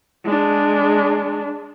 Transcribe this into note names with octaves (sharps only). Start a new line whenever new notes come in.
G#3 D4